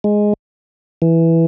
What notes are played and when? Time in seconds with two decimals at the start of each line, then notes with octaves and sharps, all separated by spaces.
0.04 G#3
1.02 E3